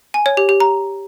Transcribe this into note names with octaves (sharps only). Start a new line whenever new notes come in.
G#5
C#5
G4
G4
A#5